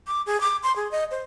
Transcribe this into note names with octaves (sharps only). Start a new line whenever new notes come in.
D6
G#4
D6
C6
G#4
D#5
C5